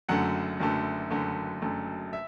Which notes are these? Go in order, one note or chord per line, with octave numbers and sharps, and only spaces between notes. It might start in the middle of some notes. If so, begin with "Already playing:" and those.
F#1 F#2 D3 A3 F#5
F#1 F#2 D3 A3
F#1 F#2 D3 A3
F#1 F#2 D3 A3
E5